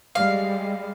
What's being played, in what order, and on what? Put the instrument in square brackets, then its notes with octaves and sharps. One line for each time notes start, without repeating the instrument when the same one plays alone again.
[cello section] G3 G#3 [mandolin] F5